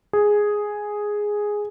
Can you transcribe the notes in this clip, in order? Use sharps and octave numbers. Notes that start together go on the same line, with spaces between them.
G#4